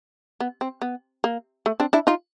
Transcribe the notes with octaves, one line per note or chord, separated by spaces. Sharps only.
B3
C4
B3
A#3
A3
C4 D4
D4 E4
D#4 F4